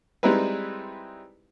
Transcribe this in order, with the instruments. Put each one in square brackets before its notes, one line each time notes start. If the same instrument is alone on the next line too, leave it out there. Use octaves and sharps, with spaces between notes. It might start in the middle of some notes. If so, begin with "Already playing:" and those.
[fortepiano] G3 G#3 C4 D#4 E4 B4